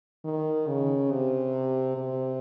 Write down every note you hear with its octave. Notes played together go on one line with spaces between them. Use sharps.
D#3
C#3
C3
C3